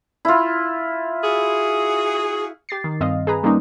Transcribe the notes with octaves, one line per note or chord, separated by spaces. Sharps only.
E4 F4
F#4 G#4
G4 A6 C7
D#3
G2 C4 D#5 F5
G#4 B4 A#5
G3 G#3 A#3 C#4 D#4